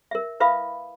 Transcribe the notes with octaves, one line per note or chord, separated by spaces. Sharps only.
A#4 E5
E4 B4 E5 F5 B5 D#6